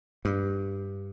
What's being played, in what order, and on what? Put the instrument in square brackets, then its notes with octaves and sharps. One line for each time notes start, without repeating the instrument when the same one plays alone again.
[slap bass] G2